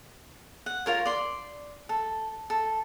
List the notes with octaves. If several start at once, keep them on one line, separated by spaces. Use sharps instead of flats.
F#5
F4 A#4 C#5
D5 C6
A4
A4